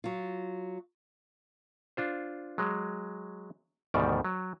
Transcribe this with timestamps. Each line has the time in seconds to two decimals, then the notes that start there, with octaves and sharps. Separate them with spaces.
0.04 F#3 F4
1.97 D4 F4 C5
2.58 F#3 G#3
3.94 D2 G#2 B2 D#3 G3 D5
4.25 F#3